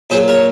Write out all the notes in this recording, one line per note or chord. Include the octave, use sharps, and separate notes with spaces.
A#2 F#3 G#4 C5
A#4 C#5